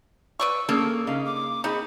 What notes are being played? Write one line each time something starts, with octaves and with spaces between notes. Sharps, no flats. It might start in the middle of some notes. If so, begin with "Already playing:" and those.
B4 D5 C#6 E6
A#3 C#4 D4 G#4 A4
C#3 D#4 F5
D6
C4 D#4 G#4 B5